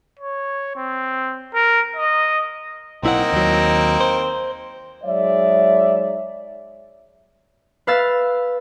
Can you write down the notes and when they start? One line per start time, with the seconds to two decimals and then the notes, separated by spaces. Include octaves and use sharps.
0.19 C#5
0.76 C4
1.55 A#4
1.96 D#5
3.03 B1 A#3 C4 D#4 E4 F#5
3.33 D#2 F#3
4.01 C5
5.03 F#3 G#3 D#4 C#5 D5 E5
7.87 B4 F5 E6 A6